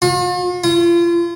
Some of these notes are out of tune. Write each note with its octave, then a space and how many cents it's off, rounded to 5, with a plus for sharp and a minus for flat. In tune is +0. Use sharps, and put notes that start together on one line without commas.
F4 +45
F4 -35